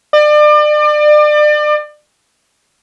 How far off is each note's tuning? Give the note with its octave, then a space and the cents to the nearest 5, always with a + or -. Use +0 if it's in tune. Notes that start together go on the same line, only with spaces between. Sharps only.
D5 +35